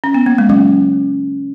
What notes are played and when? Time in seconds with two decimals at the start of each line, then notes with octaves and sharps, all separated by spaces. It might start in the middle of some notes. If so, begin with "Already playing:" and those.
0.04 C#4
0.14 B3
0.26 A#3
0.38 G#3
0.49 F#3 C#4